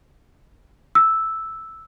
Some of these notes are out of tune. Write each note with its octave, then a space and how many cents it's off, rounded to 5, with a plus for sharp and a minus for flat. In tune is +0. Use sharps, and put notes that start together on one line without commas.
E6 -5